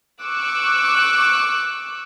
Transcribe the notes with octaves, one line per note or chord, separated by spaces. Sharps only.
C#6 D6 E6 F#6